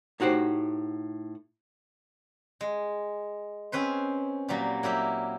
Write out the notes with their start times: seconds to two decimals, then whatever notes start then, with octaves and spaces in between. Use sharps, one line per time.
0.20 A2 D#4 F#4 G4 C5
2.61 G#3
3.72 C4 C#4 B4 C5
4.48 A#2 F#3 G3 A#3
4.83 F#3 A#3 E4 G4